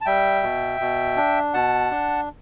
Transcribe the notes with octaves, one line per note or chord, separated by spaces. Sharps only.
A5
G3 E5 G5
B2
B2
D4
B2 F#5 A5
D4